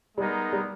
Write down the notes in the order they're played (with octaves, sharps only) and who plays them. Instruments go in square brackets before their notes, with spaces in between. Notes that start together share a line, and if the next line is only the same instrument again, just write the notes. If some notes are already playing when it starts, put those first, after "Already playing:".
[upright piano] G3 [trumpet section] G#3 B3 D#4 A#4
[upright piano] G3